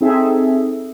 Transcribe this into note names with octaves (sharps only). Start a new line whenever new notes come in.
C4 D#4 G#4 A4 E5